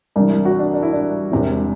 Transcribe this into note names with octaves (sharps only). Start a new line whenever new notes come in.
C2 C3 E3 D4
E4
F#4
D4
D4
E4
D4
E1 E2 C3 E3